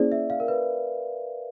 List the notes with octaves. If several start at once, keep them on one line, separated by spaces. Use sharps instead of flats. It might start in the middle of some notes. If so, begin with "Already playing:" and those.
Already playing: A#3 C#4 E4 G#4 C5 D5
E5
F5
A#4
B4